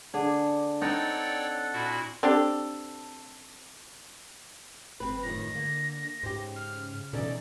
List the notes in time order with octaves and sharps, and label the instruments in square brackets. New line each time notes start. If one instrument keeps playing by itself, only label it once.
[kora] D3 G#4 [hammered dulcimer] D4
[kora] C4 D#4 [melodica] A4 F#5 [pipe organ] C#5 D5 G5
[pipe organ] A#2 E4 F#4
[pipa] C4 D4 G4 A4
[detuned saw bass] F#1 [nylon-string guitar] C4 B4
[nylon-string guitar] F2 A2 D#3 [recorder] A#6
[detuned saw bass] D3 [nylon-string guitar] A#3
[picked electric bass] G#2 [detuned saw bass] C#3 [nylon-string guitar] G4 C5
[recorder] F6
[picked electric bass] B2 E3 [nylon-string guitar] C#4 D#4 A4 [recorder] D5